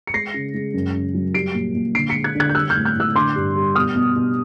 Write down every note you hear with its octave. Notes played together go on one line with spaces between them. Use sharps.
C#7
G#3 A#6 C7
C#3
G#3
F#2
C#3
F#3
G3 C7 D7
A#2
A#2
D3 C7 D7
B6 C#7
G#3
F#6 G#6
D3 F#6 G#6
G6
G3 E6 F#6
F6 G6
A2
F6 G6
A2 E6 F#6
D3 C6 D6
G2
G3
B2 D#6 F6
B2
B2